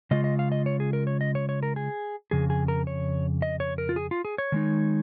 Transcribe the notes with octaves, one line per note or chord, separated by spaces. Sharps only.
C#3 G#3 F4 D#5
D#5
F5
D#5
C#5
G#4
A#4
C#5
D#5
C#5
C#5
A#4
G#4
F2 C#3 G#4
G#4
A#4
C#5
D#5
C#5
A#4
F4
G#4
F4
G#4
C#5
D#3 G#3 D#4